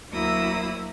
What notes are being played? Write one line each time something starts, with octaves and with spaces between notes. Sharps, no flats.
D2 F#3 A#3 E4 D#6 E6